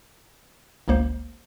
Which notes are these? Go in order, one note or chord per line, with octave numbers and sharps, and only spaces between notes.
G1 C#2 A#3 C5